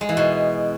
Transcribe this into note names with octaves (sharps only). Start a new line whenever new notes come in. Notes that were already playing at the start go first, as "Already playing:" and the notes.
G#3
E3
B2